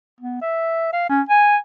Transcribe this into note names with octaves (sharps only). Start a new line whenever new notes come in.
B3
E5
F5
C#4
G#5